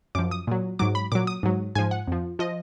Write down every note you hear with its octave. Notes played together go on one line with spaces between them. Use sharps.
F#2 F3 D6
D#6
A#2 F#3
G#2 F#3 D6
B5
A#2 F#3 D6
D#6
G#2 F#3
G#2 F3 G#5
F#5
F2 F3
F3 D#5